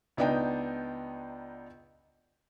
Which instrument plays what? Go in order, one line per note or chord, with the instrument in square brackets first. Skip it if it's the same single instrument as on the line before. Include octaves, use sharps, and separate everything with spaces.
[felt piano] C#2 B3 D4 D#4 D#5 G5